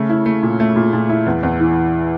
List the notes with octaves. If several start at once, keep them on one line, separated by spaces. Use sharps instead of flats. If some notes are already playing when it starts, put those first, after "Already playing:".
Already playing: C#3 A3
E4
A3
A#2
A3
A#2
A#2
E4
E2
E2
E3